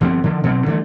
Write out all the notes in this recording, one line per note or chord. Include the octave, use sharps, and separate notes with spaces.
G1 F3 B3 C4
D3 D#3 F3
B2 F#3 B3 C4
D3 E3 G3 A3